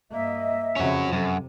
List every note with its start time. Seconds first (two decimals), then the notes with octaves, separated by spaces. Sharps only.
0.11 G2 A#3 D#5 E5
0.76 F2 C#3 C#4 F#4
1.13 F#2 C3 A4